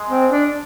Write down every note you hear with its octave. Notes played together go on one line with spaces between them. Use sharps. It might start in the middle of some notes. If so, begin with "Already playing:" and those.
Already playing: G#3
C4
D4